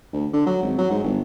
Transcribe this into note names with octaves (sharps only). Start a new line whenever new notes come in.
D2
D3
F#3
G#1
F#3
G#2
G1